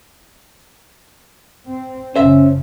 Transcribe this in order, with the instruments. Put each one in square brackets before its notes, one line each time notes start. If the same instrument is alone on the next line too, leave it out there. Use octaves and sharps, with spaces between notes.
[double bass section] C4
[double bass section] F#1 C#3 F3 [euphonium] C#4 [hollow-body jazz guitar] C5 E5